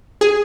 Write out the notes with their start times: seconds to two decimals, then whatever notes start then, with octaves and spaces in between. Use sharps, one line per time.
0.21 G#4